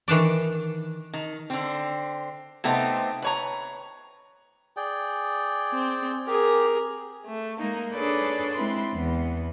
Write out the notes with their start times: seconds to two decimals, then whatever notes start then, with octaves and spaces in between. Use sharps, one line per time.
0.08 D#3 E3 D4 D5
1.13 D#3
1.50 D3 C4
2.64 C3 A3 B3 C4 D#4
3.22 B4 C#5 A#5
4.77 G#4 D5 G5
5.72 C4
6.27 G4 G#4 A#4
7.25 A3
7.59 G#3 A#3 D#4
7.93 D4 G#4 A4 B4 C#5 D5
8.54 G#3 C4 E4 B4 C6
8.94 E2 B3